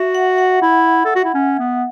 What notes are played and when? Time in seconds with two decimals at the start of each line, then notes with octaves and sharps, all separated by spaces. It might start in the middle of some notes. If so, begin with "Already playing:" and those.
Already playing: F#4 E5
0.15 F#5
0.38 F#5
0.62 E4
1.05 A4
1.16 F#4
1.25 E4
1.34 C#4
1.59 B3